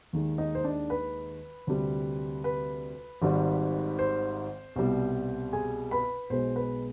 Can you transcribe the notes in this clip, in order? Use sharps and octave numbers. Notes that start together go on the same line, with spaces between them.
D#2 D#3 G#3
D#4 D#5
C5
D4 D5
B4
D2 C3 G3
B4
G#1 G#2 D#3 G3
C5
C2 B2 G3
G#4 G#5
B4 B5
B1 B2 G#3 C5
B4